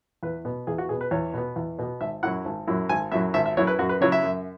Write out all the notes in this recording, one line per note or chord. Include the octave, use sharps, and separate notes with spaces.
E2 B4
B2 B3
E2 G#4
F#4
B2 B3 G#4
B4
E2 C#5
B2 B3
E2
B2 B3
G#1 E5
F#2 F#3 E4 F#5
G#1
F#2 F#3 E4
G#1 G#5
F#2 F#3 E4 E5
G#1 E5
E5
F#2 F#3 E4 C#5
B4
F#2 F#4
B4
C#3 F#3 E4 C#5
E5
F#2